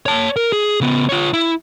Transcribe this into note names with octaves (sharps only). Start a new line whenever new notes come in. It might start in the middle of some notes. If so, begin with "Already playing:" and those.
C#5 A5
A#4
G#4
C#3 B3
F4 C#5
E4